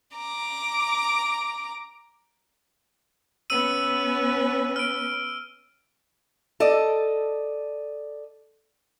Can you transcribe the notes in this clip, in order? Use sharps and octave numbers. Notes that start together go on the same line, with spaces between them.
A#5 D6
B3 C#4 B4 E6 D#7
F6 D7
A4 D5 D#5